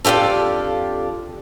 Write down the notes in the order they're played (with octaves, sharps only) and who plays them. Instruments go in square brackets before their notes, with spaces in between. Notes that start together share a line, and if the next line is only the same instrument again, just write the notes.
[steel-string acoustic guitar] F2 D4 F4 G4 A4